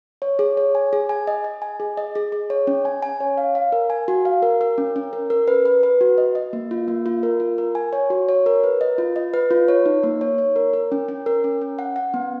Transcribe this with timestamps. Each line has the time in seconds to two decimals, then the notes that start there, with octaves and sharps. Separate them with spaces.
0.22 C#5
0.39 G#4
0.57 C#5
0.75 G#5
0.93 G#4
1.09 G#5
1.27 D#5
1.44 D#5
1.62 G#5
1.80 G#4
1.97 D#5
2.15 G#4
2.32 G#4
2.50 C#5
2.67 C#4
2.85 G#5
3.03 G#5
3.20 C#5
3.37 F5
3.55 F5
3.72 A#4
3.90 G#5
4.08 F#4
4.25 F5
4.42 A#4
4.61 A#4
4.78 C#4
4.96 C#4
5.13 A#4
5.30 A#4
5.48 B4
5.65 B4
5.83 B4
6.01 F#4
6.18 D#5
6.35 D#5
6.53 A#3
6.71 F4
6.88 A#3
7.06 F4
7.23 A#4
7.40 F4
7.58 A#4
7.75 G#5
7.93 C#5
8.10 F#4
8.29 C#5
8.46 A#4
8.64 B4
8.81 D#5
8.98 F4
9.16 D#5
9.34 B4
9.51 F4
9.68 C#5
9.86 D#4
10.03 A#3
10.21 C#5
10.38 C#5
10.56 A#4
10.73 A#4
10.92 C#4
11.08 C#4
11.26 A#4
11.44 C#4
11.61 C#4
11.79 F#5
11.96 F#5
12.14 B3